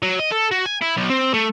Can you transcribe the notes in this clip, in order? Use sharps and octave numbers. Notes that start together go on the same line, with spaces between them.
F#3
D#5
A4
F#4
G#5
E4
B1
C4
A3